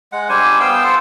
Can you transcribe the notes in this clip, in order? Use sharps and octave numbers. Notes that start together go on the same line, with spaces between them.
G#3 F#5
G3 D4 C5 G#5
B3 F5 G5 E6
F4 A4 C5 F#5